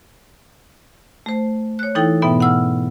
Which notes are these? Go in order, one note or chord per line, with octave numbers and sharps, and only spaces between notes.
A3 C5
C#5 F#6
E3 D#4 E4 A4 G5
G#2 B2 B3 E5 G5
F#5 E6 F6